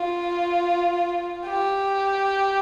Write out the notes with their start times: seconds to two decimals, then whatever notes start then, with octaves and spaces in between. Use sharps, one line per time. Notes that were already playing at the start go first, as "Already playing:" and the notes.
Already playing: F4
1.47 G4